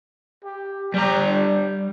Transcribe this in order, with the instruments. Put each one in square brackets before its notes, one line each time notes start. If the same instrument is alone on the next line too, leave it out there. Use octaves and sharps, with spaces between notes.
[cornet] G4
[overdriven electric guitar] G3 A#5 [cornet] G4
[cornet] D4